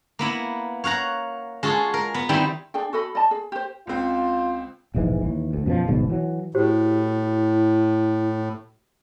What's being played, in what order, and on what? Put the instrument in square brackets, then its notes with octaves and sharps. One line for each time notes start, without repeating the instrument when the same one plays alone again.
[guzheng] A#3 B3 E4
C#5 F5 F#5 A#5
G#3 F4 F#4 G#4 A4
A#4
B3
D#3 G3 C4 E4
[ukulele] D4 G#4 D5 G5
F#4 A4 D#5 B5
D5 D#5 A5
G#4
G4 C5
[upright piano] C#2 C4 [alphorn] F4
[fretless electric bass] E1 A#1 G#2 E3
D#2 E3
D2
F#2 B2 D3 F3
D1 G1 G#2 B2
E3 F#3
[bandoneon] A2 [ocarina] E4 [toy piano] F#4 G4 C5